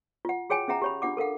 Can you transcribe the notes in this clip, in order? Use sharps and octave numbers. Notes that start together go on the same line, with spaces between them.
F4 F#5
F#4 G#4 C#5 G5 G#5
C#4 G#4 E5 F#5 A#5
G4 C#5 B5
D4 F4 F#5 D6
A4 A#4 F5 F#5